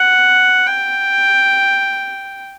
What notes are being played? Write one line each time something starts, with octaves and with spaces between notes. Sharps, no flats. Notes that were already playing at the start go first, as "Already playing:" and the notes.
Already playing: F#5
G5